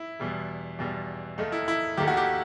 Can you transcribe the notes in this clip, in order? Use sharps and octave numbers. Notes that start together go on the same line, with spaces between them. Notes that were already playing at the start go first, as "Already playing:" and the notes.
Already playing: E4
E2 B2 G3
E2 B2 G3
D#2 D#3 A3 D#4
E4
E4
D#2 D#3 A3 G4
F#4
G4